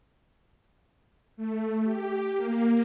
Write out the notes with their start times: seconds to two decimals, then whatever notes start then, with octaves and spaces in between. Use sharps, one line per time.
1.37 A3
1.84 G4
2.35 A#3